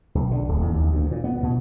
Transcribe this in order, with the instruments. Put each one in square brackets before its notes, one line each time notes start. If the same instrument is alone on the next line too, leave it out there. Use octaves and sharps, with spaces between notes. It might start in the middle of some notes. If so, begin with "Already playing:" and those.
[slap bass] B1
D3
D1
E2
D#2
D2
A#2
B3
B2